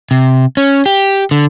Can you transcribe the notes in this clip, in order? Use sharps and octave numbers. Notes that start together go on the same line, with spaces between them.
C3
C#4
G4
D3